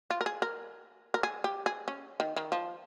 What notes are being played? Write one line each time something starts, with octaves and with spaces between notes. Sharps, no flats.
F4
A#4
G#4
A#4
A#4
G#4
G4
G#4
C#4
D#3
D#3
F3